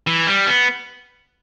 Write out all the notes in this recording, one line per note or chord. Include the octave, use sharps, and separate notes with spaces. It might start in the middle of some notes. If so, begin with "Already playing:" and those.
E3
G3
B3